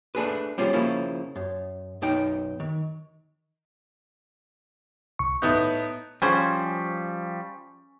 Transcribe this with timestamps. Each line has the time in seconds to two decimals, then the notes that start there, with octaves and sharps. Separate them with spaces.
0.15 A3 D4 G#4 B4
0.58 G3 C#4 F4 G#4 C5
0.73 C#3 F3 A#3 E4
1.36 F#2
2.02 B1 F#2 D#4 G5
2.60 D#3
5.19 C2 C#6
5.42 A2 B3 D#4 D#6 G6
6.22 F3 G3 C#4 G#4 C5 G#5 C#6